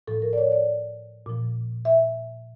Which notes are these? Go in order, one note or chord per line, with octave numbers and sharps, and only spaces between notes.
A2 F3 A4
A#4
D5
C#5
D5
A#2 F3
E5